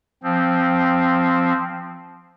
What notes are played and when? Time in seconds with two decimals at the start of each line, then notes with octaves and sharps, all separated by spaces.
0.23 F3 C4